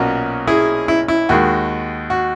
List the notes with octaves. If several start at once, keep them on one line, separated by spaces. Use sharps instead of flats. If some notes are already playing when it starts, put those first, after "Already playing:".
Already playing: B1 A#2 A#3 C#4 F#4
E4 G#4
E4
E4
D#2 D#3 G#3 F#4
F#4